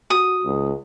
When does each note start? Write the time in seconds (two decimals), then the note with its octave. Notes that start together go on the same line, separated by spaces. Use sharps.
0.10 F#4 D#6
0.44 C#2